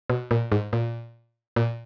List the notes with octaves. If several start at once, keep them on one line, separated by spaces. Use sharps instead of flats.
B2
A#2
G#2
A#2
A#2